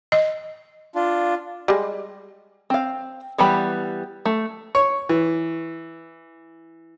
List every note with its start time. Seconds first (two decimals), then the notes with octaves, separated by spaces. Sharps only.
0.12 D#5
0.95 D4 F4
1.68 G3 G#3
2.70 C4 F5
3.38 E3 G3 B3 G4 B5
4.25 A3
4.75 C#5
5.09 E3